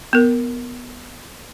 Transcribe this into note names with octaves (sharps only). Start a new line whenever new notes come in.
B3 A#4